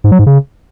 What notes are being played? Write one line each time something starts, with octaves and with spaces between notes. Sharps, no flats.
G#2
F#3
G#2
C#3